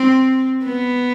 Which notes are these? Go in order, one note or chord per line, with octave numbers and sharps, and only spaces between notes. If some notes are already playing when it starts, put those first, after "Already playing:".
Already playing: C4
B3